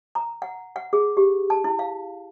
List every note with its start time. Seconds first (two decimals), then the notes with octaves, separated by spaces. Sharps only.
0.15 A#5
0.42 F#5
0.76 F#5
0.93 G#4
1.17 G4
1.50 A5
1.64 E4
1.79 F5